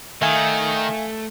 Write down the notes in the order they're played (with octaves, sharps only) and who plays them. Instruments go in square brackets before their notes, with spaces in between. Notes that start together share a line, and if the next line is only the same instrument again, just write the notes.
[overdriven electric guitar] D#3 [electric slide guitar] A3 [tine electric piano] E5 F5 G#5